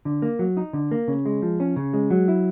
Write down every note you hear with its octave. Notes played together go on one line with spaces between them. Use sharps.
D3
A#3
F#3
D#4
D3
A#3
C#3
G#3
F3
C#4
C#3
G#3
F#3
E4